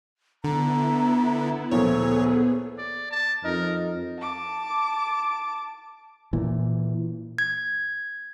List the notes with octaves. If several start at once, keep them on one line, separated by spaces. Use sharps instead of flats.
D3 B3 E4 A#5
D2 A#2 F3 B3 G#4 A4 C#5
D5
A5
F2 D#4 A#4
A5 D6
A#2 E3
G#6